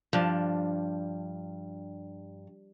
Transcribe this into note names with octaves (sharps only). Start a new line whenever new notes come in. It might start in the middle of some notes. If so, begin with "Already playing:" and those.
G2 F3 D4